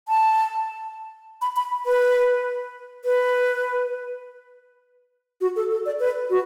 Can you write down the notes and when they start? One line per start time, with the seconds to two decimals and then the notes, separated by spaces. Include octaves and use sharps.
0.08 A5
1.42 B5
1.56 B5
1.86 B4
3.05 B4
5.41 F#4
5.56 A4
5.71 A4
5.86 D5
6.00 B4
6.30 F#4